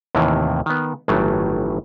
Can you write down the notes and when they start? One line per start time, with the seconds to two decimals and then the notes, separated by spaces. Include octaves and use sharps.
0.15 D#2 A2 C3 D#3 E3
0.66 D#3 B3
1.08 G1 A2 D#3 E3 F#3 A3